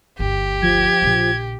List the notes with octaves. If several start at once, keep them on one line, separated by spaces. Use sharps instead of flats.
G1 D2 G4
F3 G#6
A#1 C#3